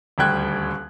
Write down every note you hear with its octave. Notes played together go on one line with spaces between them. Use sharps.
D#1 D2 G3 G5 F#6 G#6